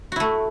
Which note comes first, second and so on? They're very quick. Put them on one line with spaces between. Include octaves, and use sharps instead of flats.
F#4 E4 A3